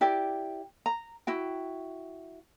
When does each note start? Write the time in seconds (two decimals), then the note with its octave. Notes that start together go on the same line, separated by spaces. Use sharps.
0.01 E4 G4 D5
0.86 A#5
1.27 E4 F#4 G5